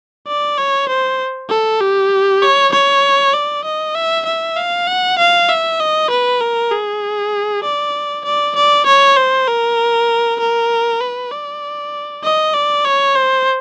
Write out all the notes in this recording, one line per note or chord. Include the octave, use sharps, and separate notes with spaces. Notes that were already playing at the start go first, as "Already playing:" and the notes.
D5
C#5
C5
A4
G4
C#5
C#5
D5
D#5
E5
E5
F5
F#5
F5
E5
D#5
B4
A#4
G#4
D5
D5
D5
C#5
C5
A#4
A#4
B4
D5
D#5
D5
C#5
C5